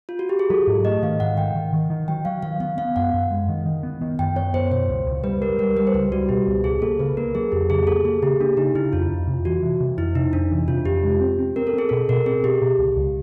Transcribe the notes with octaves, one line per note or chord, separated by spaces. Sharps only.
F4
F#4
G4
G#4
F#3 A4
G#2
A3 D#5
D#3 F5
G#2 F#5
D#3 G5
D#3
D#3
D#3
F#3 G5
F#3 F5
D#3 F5
B3 F5
B3 F5
F#2 F#5
F#2
G#3
D#3
D#3
B3
D#3
F#2 G5
B3 C#5
F#2 C5
B2 C5
C#2
C#2
G3 B4
G3 A#4
G3 A#4
G3 B4
C5
C#2 B4
G3 F#4
B2 G4
C#2
C#2 G#4
A#3 A4
C#3 B4
A#3 A#4
F#3 G#4
F2 G4
C#3 G#4
A#3 A4
A#3 G#4
C#3 G4
A#3 D4
C#3 D#4
C#3 E4
F2 F4
F2
C3
E3 F#4
E3
C3
F2 E4
C3 D#4
F2 D4
E3
C3 F4
F2 G4
G#3
C4
C4
C4 A#4
A4
C4 G#4
B2 A4
B2 A#4
C4 G#4
B2 G4
B2
C#2
C#2